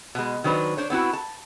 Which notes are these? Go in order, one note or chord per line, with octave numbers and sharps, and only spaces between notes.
B2 G#3
D#3 F#3 D4 B4 C5
D4 C5 C#5
B3 C4 E4 F#4
A5